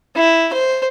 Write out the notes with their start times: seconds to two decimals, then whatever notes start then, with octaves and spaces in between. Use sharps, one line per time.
0.16 E4
0.53 C5